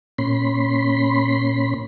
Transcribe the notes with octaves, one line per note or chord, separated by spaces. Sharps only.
A#2 C#4 B5 C6